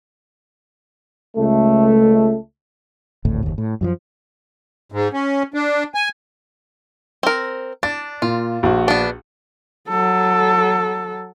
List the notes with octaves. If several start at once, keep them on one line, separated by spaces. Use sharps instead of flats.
C#2 A3
D1 G#1 D2 A2
F#1 D#2
A2
F#2 E3 F3
G#2
C#4
D4
G#5
C4 A#4
D4 A6
A#2 F4
A#1 F#4
B3 D4
F#3 A4